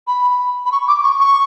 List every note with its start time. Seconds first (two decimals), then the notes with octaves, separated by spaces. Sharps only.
0.07 B5
0.66 B5
0.72 C#6
0.88 D6
1.04 C#6
1.20 C#6